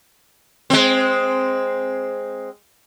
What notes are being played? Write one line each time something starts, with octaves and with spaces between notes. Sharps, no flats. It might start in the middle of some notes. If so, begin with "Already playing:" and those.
G#3 C4